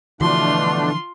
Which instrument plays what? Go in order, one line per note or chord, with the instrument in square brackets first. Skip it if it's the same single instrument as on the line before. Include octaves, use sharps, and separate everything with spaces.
[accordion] B2 A3 D4 [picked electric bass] D3 E3 F3 [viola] F4 C6